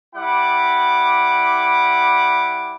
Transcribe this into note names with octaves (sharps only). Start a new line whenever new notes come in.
G3 E4 F#5 D6